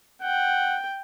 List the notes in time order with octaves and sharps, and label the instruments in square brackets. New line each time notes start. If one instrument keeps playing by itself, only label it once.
[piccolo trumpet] F#5 [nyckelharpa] G5